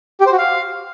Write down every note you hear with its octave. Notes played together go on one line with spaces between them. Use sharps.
G4
C5
F#4
F5